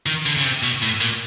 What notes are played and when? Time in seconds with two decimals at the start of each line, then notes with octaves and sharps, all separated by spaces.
0.06 D#3
0.26 D3
0.37 C#3
0.44 C3
0.63 B2
0.82 A2
1.01 A#2